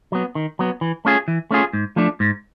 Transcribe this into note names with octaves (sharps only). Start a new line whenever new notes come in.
F#3 B3
D#3
F#3 B3
E3
A3 C#4 F4 G#4
E3
A3 C#4 F4 G#4
G#2
F3 A3 D4
G#2